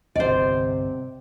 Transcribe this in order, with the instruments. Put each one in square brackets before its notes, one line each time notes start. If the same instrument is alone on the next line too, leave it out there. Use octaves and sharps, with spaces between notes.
[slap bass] G1 C2 [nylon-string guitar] C3 F#5 [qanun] C5 D5 [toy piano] D#5